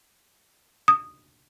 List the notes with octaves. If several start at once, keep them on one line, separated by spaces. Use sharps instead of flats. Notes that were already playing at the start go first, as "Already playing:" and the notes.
D#6